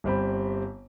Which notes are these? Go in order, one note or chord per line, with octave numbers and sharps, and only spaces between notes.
G1 G3 C4 B5